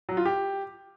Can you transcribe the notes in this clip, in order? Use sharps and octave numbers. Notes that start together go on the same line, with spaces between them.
F#3
F4
G4